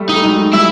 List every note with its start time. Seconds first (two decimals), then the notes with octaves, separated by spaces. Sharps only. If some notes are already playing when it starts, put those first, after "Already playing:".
Already playing: G3 A3
0.09 D#4
0.15 A3
0.24 F#3 G#3
0.54 F3 G3 E4